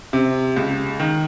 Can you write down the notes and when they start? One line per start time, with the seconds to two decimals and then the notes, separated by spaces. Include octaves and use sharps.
0.13 C3
0.56 C#2
1.00 D#3